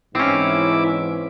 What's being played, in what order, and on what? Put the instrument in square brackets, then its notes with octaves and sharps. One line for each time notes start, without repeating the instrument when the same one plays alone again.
[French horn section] G#2 E3 [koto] C4 C#4 [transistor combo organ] E4 D6